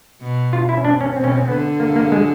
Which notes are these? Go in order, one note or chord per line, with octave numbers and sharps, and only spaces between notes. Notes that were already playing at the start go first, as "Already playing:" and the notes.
B2
F4
E4
C#4
D4
C#4
B2 C4
C#4
C4
D3 B3
A#3
A#3
G#3